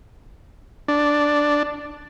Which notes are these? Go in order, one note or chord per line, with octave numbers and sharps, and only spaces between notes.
D4